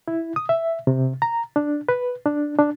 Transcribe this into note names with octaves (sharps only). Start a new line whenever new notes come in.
E4
D#6
E5
C3
A#5
D4
B4
D4
D4